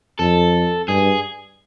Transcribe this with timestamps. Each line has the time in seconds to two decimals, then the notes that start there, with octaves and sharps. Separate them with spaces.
0.19 F2 A4
0.88 G2 G#4